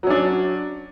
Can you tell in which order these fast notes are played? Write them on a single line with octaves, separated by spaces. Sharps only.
F#3 C#4 D4